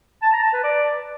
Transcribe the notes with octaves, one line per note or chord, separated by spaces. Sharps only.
A5
A#5
A5
B4
D5